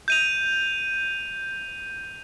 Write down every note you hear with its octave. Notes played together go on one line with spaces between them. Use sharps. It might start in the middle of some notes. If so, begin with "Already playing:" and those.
G6 D#7 F7